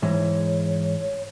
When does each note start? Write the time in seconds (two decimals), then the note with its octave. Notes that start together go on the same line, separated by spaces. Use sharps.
0.02 G#2 E3 G#3 C#5